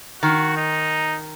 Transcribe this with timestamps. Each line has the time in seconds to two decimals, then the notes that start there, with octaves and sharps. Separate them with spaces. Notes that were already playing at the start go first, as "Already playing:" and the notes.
0.23 D#3 F#4
0.57 D#4